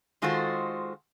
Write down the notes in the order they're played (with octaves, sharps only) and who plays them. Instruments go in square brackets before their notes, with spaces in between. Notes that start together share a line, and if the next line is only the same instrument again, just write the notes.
[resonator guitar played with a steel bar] D#3 G#3 F4 F#4 A4 C5